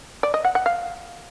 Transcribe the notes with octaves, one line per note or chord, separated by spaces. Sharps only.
D5
D#5
F#5
F#5
F5